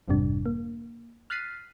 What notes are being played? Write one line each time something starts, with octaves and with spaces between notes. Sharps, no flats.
G1 F2 G#2 C3 G3 D4
A#3
F6 F#6 A6 B6 C7 D#7